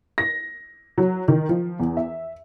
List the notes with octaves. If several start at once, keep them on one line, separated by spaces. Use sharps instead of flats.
A#6
F#3
D#3
F3
E2
E5